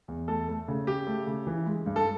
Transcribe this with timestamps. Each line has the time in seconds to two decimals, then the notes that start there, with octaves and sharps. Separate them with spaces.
0.08 E2
0.28 A3 A4
0.49 A3
0.68 C#3
0.87 C#3 G4
1.07 A3
1.27 C#3
1.47 E3
1.66 G#3
1.86 G2
1.96 A4